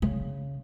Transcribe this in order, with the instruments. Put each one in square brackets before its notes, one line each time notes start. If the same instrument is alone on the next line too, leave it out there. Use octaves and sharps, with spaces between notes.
[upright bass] C#3